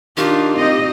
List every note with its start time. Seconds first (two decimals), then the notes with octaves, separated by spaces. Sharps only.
0.17 D#3 D4 D#4 F4 G4
0.57 C4 D#4 D#5